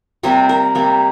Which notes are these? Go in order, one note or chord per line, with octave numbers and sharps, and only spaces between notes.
C3 G3 A#3 C5
A#4
C3 G3 A#3